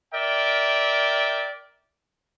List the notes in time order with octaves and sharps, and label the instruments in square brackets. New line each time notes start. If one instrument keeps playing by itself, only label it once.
[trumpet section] A#4 D5 E5 G5